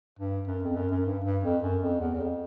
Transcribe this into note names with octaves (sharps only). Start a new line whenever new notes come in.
G2
F#2
F2
F#2
F#2
G2
G2
F2
F#2
F2
E2
E2
F2